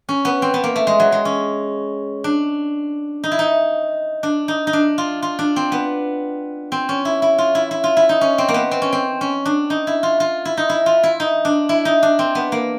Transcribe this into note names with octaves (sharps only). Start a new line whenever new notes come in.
C#4
B3
C4
B3
A#3
A3
G#3
F#3
G#3
C#4
D4
D#4
E4
D#4
D4
D#4
D#4
D4
F4
F4
D4
C4
B3
C4
C#4
E4
E4
F4
E4
E4
F4
E4
D#4
C#4
C4
A#3
B3
C4
C#4
C4
C#4
D4
D#4
E4
F4
F4
E4
D#4
E4
F4
E4
D#4
D4
E4
D#4
D4
C4
B3
A#3